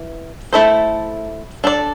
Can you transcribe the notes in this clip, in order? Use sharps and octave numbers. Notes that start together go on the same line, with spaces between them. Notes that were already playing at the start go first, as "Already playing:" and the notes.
Already playing: E3
A3 E4 A4 C5
D4 A4 D5